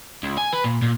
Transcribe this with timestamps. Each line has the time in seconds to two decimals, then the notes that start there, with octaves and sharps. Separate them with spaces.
0.23 C#2
0.38 G#5
0.53 B4
0.64 A#2
0.82 A#2